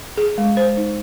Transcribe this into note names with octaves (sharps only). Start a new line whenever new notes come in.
G#4
G#3
C5
D#4